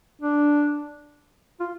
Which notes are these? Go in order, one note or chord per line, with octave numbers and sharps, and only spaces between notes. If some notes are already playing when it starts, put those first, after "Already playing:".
D4
F4